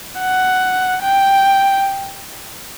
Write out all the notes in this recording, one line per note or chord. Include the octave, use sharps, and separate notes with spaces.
F#5
G5